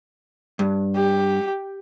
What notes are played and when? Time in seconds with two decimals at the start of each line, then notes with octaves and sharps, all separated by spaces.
0.59 G2
0.95 G4